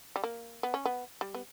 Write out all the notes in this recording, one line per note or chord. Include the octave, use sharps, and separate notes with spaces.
G3
A#3
B3
C#4
B3
G3
B3